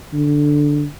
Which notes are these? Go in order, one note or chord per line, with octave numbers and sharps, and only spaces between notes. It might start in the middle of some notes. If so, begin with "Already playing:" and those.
D3